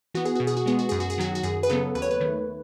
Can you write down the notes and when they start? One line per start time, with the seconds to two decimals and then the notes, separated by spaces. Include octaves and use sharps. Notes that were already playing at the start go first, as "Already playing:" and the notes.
0.14 E3 B3 F#4
0.25 G#4
0.35 B2 F#4
0.47 G#4
0.57 F#4
0.66 G#3 B3 G#4
0.79 F#4
0.89 F#2 G#4
1.00 F#4
1.10 G#4
1.18 D#3 F#3 F#4
1.35 F#4
1.43 F#2 G#4
1.63 B4
1.69 C#3 F#3 B3 A4
1.95 D#2 B4
2.02 C#5
2.11 B4
2.20 D#3 A3